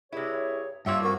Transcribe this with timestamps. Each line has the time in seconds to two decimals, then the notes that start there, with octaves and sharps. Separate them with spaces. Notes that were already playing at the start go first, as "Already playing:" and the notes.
0.12 G2 C3 E4 G#4 C#5
0.86 G2 A#3 F4 C#5 E5 G5
1.04 F3 C4 F#4 A#4